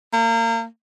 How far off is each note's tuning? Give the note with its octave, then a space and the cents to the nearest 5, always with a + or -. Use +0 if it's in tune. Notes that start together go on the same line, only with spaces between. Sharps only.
A#3 -30